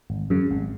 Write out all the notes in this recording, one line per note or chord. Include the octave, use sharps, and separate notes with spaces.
G#1
F#2 C#3
G#1